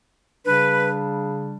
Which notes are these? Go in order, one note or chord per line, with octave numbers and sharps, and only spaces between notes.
C#3 G3 D4 B4